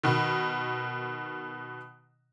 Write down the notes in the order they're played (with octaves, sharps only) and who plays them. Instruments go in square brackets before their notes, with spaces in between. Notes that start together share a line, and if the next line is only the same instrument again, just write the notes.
[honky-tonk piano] B2 D#3